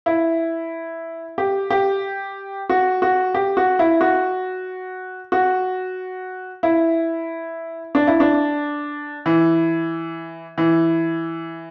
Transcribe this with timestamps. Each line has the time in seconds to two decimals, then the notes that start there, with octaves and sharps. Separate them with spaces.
0.06 E4
1.38 G4
1.70 G4
2.70 F#4
3.02 F#4
3.34 G4
3.57 F#4
3.79 E4
4.01 F#4
5.32 F#4
6.63 E4
7.95 D4
8.07 E4
8.20 D4
9.26 E3
10.58 E3